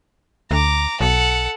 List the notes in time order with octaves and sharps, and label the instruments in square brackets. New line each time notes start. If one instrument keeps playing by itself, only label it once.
[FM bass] D2 [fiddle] A#5 D6
[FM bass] B1 [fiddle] A4 F#5